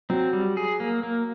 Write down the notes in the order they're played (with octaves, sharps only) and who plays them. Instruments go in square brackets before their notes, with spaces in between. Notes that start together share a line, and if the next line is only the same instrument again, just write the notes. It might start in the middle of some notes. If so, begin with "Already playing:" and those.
[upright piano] F#3 [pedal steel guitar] C4
[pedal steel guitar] G3
G#4
A#3
A#3